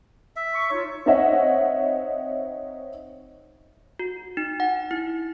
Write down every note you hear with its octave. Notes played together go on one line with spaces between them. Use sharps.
E5
C#6
D#4 F4 C#5
C4 D#4 C#5 D#5 E5 F#5
F#4
D#4
F#5
E4